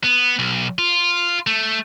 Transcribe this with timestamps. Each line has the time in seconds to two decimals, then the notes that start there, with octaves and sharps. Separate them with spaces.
0.04 B3
0.39 B1
0.79 F4
1.47 A3